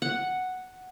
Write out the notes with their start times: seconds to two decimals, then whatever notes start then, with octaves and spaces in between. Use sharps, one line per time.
0.02 F#5